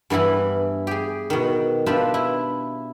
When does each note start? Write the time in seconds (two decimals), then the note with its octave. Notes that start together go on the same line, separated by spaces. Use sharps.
0.10 G2 E3 B3 E4 B5
0.87 G4 G#4
1.30 B2 D#3
1.86 D4 F4 G4 B4 E5
2.14 E4